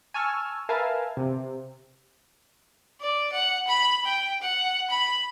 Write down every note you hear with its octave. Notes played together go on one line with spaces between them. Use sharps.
G#5 A5 C#6 E6 F6
A#4 B4 E5 F5 G#5 A5
C3
D5
F#5
B5
G5
F#5
B5